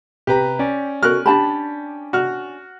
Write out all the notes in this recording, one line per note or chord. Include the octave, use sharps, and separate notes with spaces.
C3 G4 B4 A#5
C#4 D5
F#4 A#4 F6 F#6
D4 G4 A5 B5
F#4 F6